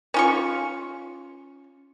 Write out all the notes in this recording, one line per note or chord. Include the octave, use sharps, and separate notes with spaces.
C#4 F4 C#6